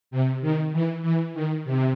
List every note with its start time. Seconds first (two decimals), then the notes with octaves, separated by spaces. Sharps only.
0.11 C3
0.41 D#3
0.73 E3
1.02 E3
1.34 D#3
1.65 C3